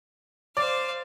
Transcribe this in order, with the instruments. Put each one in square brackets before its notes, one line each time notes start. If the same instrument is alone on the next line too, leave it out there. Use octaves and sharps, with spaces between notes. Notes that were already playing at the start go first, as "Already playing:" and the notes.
[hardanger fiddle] C5 F5 [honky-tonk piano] D5